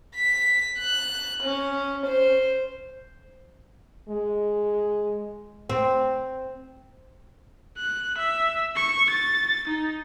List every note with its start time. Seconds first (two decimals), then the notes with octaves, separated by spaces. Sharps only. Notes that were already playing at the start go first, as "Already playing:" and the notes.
0.15 B6
0.79 F#6
1.43 C#4
2.06 C5
4.09 G#3
5.70 C4
7.78 F#6
8.18 E5
8.76 C#6
9.10 A6
9.68 D#4